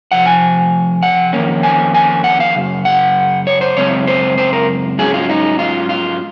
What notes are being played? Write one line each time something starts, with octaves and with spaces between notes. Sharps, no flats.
C3 F3 F#5
G#5
F#5
F2 D#3 A#3 C#4
G#5
G#5
F#5
F5
F#2 C#3
F#5
C#5
C5
F#2 C#3 G#3 C4 C#5
C5
C5
A#4
G#2 F#3 C#4 G#4
F4
D#4
F4
F4